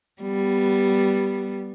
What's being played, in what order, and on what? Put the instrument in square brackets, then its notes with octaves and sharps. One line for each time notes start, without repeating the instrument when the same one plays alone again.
[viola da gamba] G3 B3